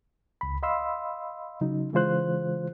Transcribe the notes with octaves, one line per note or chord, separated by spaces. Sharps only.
C#2 B5
D#5 F5 B5 C6 E6
C#3 F#3 D#4
C#3 E3 G#3 F4 C5 F#6